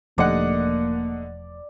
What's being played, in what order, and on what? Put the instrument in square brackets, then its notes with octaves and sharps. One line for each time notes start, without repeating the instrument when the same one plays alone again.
[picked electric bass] E1 F3 A3 [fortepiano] D3 D#4 F#5 [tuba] A#3 [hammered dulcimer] D5